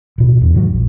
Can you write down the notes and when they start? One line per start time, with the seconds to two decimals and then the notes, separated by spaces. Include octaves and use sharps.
0.18 D1 B2
0.41 E2
0.54 G#2 D#3 F#3
0.73 A#1